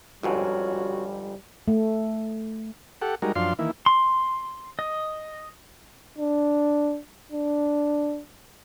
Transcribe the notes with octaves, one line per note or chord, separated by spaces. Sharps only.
G1 F2 G#2 G3 C#4 F#4
A3
G4 A4 F#5
G3 G#3 D#4 F#4 A#4
F#2 F3 D4 F5 C6
D#3 E3 A#3 E4
C6
D#5
D4
D4